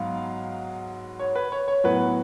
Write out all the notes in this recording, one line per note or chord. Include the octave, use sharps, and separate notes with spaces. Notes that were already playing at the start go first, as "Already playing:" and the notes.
Already playing: G#2 F#3 B3 F5
C#5
B4
C#5
C#5
A2 F#3 B3 B4